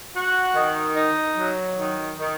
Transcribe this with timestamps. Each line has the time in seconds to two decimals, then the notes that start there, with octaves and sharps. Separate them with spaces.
0.15 F#4
0.55 D#3
0.95 D#4
1.36 F#3
1.77 D#3
2.17 D#3